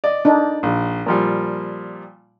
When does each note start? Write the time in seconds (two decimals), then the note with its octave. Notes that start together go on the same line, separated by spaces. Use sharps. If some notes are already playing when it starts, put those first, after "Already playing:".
0.04 D5 D#5
0.25 D4 D#4
0.63 A#1
1.06 A#2 F3 G3